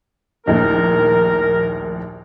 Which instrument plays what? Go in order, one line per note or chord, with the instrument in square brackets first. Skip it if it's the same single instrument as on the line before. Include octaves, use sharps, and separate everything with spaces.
[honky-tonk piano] A#1 D#2 A2 [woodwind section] A#4